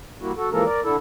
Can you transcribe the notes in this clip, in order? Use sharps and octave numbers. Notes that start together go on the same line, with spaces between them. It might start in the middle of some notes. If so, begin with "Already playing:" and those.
G3 A#3 E4 F#4
F#4 A4
E3 F3 G#3 A#3 A4 A#4
A#4 D5
D3 D4 E4 A4